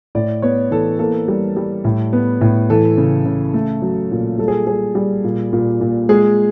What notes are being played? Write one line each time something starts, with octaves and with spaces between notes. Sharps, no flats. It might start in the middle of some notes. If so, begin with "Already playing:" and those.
A2 D5
B3 C#5
E3 A4
A#3 A4
G3
G3
A2
B3
A2
E3 A4
C#3
C#3
A3
F#3
A#2
G3 A4
G#4
G3 G#4
G3
A#2
A#2
A#2
G#3 G#4